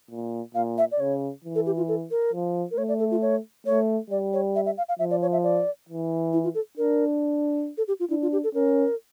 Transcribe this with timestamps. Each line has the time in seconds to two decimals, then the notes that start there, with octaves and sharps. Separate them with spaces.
0.11 A#2
0.55 A#2 F5
0.78 E5
0.91 D5
0.99 C#3 C#5
1.44 E3
1.55 A4
1.66 G4
1.77 F4
1.88 A4
2.11 A#4
2.33 F3
2.71 A#4
2.77 A3 C#5
2.88 D5
2.99 A4
3.11 F4
3.22 C#5
3.66 A3 C#5
4.10 G3 D5
4.33 C#5
4.55 E5
4.66 E5
4.78 F5
4.89 F5
4.99 F3 E5
5.11 D5
5.22 C#5
5.32 E5
5.43 D5
5.89 E3
6.33 E4
6.44 F4
6.54 A4
6.77 D4 A#4
7.77 A4
7.88 G4
8.00 F4
8.10 D4 E4
8.22 F4
8.32 G4
8.44 A4
8.54 C#4 A#4